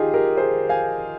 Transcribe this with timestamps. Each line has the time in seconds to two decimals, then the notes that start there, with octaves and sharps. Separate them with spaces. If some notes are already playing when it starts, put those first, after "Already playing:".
Already playing: D#4 F4 G4 G#4
0.14 G4 A#4
0.37 G#4 C5
0.69 F5 G#5